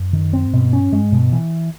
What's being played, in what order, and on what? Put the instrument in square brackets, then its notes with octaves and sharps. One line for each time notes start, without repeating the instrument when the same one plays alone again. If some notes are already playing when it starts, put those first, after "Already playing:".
Already playing: [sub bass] F#2
[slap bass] D#3
C4
[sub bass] G#2
[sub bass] G2 [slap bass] B2
[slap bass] C#4
[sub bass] G2 [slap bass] G#3
[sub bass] G#2
[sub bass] G2 [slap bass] B2
[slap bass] E3